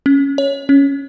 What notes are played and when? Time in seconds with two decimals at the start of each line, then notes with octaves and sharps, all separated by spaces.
0.06 C#4
0.38 C#5
0.69 C#4